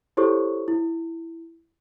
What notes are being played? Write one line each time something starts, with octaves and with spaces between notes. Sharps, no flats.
E4 G4 A4 C5 C#5 C#6
E4